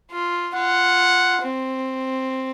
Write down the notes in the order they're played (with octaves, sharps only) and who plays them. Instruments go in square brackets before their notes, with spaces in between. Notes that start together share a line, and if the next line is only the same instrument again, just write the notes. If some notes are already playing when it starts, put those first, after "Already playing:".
[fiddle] F4
[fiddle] F4 [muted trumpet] F#5
[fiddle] C4